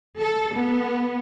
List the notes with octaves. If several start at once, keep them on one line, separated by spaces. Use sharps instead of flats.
A4
B3